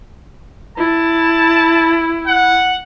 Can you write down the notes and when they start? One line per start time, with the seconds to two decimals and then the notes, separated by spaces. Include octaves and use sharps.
0.78 E4 A5
2.27 F#5